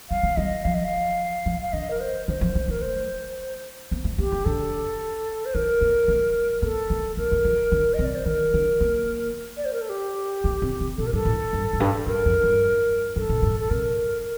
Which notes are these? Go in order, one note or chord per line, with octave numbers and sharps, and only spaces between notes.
G3 F5
A3
G3 D#5
F3 F5
D#5
F5
F3
F5
D3 D#5
A#4
C5
D3 C5
F3
A3
A3 A#4
C5
A#3
A3
A#3 G4
A3
D3 A4
C5
D#3 A#4
A#3
A3
A#3 A4
A3
A3 A#4
A3
F3
D3
D#5
C3
D5
C5
D#3 A#4
D3
A#3
D5
C5
A#4
A4
G4
A3
C3
C3
A#2 A4
A#4
G2 A4
A2
G2
F2
G2
G2 A#4
F2
G2
G2 A4
A2
G2
A4
C3 A#4